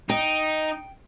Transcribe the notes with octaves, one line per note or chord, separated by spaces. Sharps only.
D#4 G5